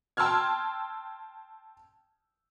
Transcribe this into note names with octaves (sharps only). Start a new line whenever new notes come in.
G5 A5 C6 E6 F6 G#6